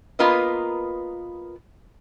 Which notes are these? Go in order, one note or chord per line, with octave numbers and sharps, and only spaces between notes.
A#3 B3 F4 A#4 B4 D#5